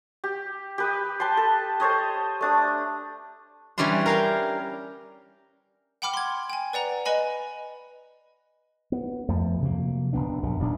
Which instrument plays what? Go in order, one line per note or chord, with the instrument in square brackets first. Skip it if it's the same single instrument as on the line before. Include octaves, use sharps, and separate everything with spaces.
[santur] G4
G4 B4 D#5
B4 G5 A5 C6
A4
A4 C5 C#5 D#5
A3 D4 D#6
[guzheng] E3 G3 C#4 D4 C6
A#4 F5 G5
[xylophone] F#5 G5 B5 D6 F6
C6 G#6
G5 G#5
B4 D5 F#5 A#5
B4 D#5 G#5 B5
[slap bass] B3
F2 F3 A3
C3 F3 F#3 A#3
F#1 B2 B3 D4
A#1 F#2 C3
D#1 B1 C#4 D4